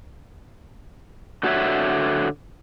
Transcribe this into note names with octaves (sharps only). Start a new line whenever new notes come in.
D3 F#4 G4 C5 C#5 E5